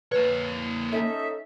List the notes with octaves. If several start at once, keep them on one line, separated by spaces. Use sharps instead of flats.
A#3 B4 C#5
C#4 D#4 A4 E5